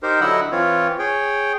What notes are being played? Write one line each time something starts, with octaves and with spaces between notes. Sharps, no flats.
D#4 G4 A#4 C5
D3 F#3 E4 D#5 F#5 E6
E3 C4 F4 C#5
G#4 C#5 G5